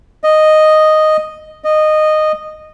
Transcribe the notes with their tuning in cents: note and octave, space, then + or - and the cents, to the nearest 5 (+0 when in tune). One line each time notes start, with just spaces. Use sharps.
D#5 -5
D#5 -15